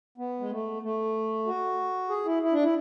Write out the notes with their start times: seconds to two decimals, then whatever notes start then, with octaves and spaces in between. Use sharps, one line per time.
0.18 B3
0.40 G#3
0.51 A3
0.82 A3
1.46 F#4
2.10 G#4
2.25 E4
2.43 E4
2.53 D4
2.63 E4